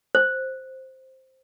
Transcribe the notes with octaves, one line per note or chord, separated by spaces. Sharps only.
C5